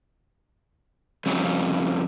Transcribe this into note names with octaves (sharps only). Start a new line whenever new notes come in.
F2 C#3 F#3 G3